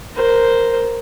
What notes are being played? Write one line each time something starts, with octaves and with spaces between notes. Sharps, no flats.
A#4 C5